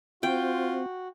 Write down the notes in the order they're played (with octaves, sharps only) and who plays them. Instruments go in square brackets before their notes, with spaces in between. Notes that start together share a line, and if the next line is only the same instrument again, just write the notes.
[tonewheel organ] C4 [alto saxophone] F4 [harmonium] F#4 [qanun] G5